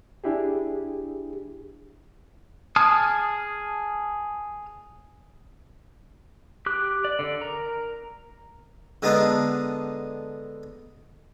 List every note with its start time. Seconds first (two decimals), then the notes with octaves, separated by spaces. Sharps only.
0.24 D4 E4 G4 G#4
2.76 G#4 A5 D#6 F6
6.66 G4 D6 F#6
7.05 D5
7.19 D3 D5
7.42 A#4 A#5
9.02 D3 G#3 B3 D4 D#4